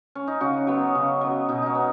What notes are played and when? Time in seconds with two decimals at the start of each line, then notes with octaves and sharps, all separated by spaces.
0.15 C#4
0.27 D#4
0.41 C#3 C#4 F#4
0.67 F#3 B3
0.95 C#3
1.21 F#3 B3
1.49 B2 D#4
1.62 C#4 D#4
1.75 B3